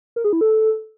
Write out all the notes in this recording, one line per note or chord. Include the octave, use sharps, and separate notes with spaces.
A#4
G#4
E4
A4